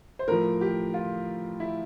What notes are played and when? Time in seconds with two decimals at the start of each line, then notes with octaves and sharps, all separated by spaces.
0.19 C5
0.28 A2 F3 A#4
0.61 G4
0.94 F4
1.60 E4